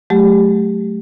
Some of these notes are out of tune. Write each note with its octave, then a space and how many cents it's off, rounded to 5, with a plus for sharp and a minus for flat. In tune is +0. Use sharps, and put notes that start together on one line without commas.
F#3 +0 A3 -25 G4 +10